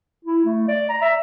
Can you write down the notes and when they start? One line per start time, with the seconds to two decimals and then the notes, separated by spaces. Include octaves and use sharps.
0.25 E4
0.45 A3
0.68 D5
0.89 A#5
1.02 E5